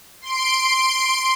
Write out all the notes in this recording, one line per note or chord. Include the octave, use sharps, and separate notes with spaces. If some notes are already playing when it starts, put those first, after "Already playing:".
C6 D7